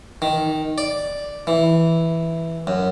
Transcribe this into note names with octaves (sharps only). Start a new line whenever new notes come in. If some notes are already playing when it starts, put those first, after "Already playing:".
D#3
D5
E3
F#2